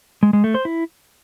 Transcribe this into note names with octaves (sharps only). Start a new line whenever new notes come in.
G#3
G#3
A3
C5
E4